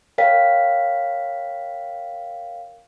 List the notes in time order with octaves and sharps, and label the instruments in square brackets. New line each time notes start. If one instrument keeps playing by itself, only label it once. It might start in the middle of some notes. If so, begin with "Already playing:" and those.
[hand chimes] A#4 C#5 F5 G5 B6